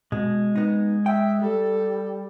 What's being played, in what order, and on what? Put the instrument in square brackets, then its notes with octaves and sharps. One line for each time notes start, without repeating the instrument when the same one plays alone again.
[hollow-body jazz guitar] B2 [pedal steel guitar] G#3
[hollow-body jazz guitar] B3 D#4
[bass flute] E5 [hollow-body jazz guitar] G5
[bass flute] G3 [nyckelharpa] A4